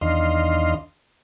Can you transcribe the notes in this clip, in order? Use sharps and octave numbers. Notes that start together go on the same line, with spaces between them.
E2 D#3 D4 D#5 F5 C6